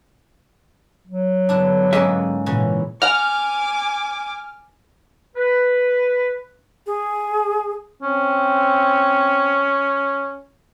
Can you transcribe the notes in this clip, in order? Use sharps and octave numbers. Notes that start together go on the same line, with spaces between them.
F#3
G2 D3 B3 D4 E4
G#2 A#3 C#4 D#5 E5
A#2 C#3 E3 C#4 F#4
F#5 G#5 A#5 D6 F6
B4
G#4
C4 C#4